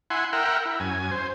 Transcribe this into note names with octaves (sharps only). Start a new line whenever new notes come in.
E4 F#5 G#5 C6
A#4 E5 F#5 G5
E4
F#2 G#5
C5